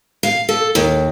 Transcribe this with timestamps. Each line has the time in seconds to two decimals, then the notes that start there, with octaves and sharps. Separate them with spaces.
0.23 F5
0.49 A4
0.75 D#2